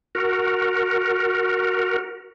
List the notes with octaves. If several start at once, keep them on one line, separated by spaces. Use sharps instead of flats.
F#4 A#4